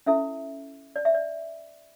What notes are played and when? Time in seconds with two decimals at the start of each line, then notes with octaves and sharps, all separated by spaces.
0.06 C#4 E4 A4 E5
0.96 D5
1.05 E5
1.15 D5